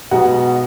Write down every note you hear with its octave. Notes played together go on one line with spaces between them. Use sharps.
B1 B2 G#3 B3 F#4 F#5